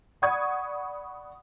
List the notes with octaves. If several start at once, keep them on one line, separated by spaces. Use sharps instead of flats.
D5 F#5 B5 C#6 D#6 G#6